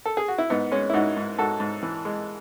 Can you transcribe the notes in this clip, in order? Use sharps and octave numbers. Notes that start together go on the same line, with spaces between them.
A4
G#4
F#4
E4
G#2 B3 D#4
G#3 C#4
E4
G#2 D#4 F#4
G#2
G#2 F#4 A4
G#2
E3
G#3